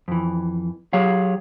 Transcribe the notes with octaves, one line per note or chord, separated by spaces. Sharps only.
F2 E3
F#3 G4 G#4 C#5 F5